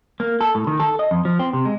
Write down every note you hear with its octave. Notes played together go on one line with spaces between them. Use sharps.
A#3
A4
A2
D#3
A4
D#5
F2
F3
C4
C3
G#3